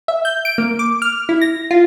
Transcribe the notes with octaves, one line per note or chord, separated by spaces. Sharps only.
E5
G6
D7
A#3
D6
F6
E4
A#6
F4